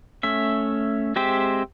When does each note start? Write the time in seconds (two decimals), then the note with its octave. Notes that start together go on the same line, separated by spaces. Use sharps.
0.23 A3 C#4 E5
1.16 G#3 C4 G4 C5 E5